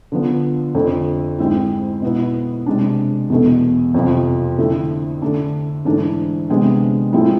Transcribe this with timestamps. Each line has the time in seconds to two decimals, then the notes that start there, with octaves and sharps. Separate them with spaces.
0.12 D3 F3 B3
0.75 F2 D3 A3
1.38 G#2 G#3 C4 E4
2.02 B2 B3 E4
2.66 C3 G#3 D4
3.30 E2 B2 A3
3.94 F2 C3 F3
4.58 D3 A3 C4 E4
5.22 D3 A3 D4
5.85 G#2 E3 A3 D4
6.50 C3 G#3 B3 D4
7.13 A2 F3 G#3 C4 E4